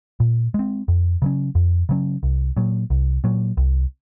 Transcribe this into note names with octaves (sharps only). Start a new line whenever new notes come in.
A#2
G#3 C4
F2
C#3 F#3 C#4
F2
C#3 F#3 C#4
C2
A#2 F#3
C2
A#2 F#3
C2